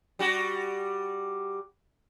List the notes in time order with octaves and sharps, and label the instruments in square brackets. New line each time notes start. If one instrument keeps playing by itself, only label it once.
[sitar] G3 F#4